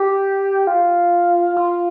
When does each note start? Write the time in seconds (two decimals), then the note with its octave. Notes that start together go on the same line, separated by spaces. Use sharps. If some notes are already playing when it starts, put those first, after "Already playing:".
Already playing: G4
0.67 F4
1.56 F4